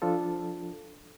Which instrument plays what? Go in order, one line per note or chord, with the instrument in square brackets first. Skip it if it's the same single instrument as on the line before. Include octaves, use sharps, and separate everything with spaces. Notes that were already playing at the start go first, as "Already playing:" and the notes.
[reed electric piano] F3 D4 F4 A4